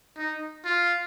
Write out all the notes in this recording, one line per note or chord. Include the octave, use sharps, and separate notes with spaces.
D#4
F4